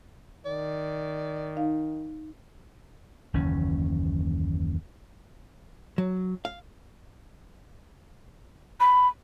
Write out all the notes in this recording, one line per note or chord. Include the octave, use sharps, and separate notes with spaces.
D#3 D5
D#4 F5
F#1 D#2 E3 C#4
F#3
F5
B5